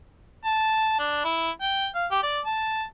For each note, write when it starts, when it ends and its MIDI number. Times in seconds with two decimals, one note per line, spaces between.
0.45 0.94 81
0.99 1.20 62
1.24 1.50 64
1.62 1.86 79
1.95 2.06 77
2.11 2.19 67
2.23 2.39 74
2.45 2.83 81